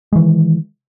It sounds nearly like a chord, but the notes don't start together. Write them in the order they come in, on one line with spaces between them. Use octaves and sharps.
G#3 E3 D#3